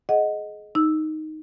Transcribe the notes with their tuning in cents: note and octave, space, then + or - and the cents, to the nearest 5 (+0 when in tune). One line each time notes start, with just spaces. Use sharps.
G#4 +30 D#5 +0 F#5 +0
D#4 +0 E6 +0